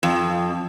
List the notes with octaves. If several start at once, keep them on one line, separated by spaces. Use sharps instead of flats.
F2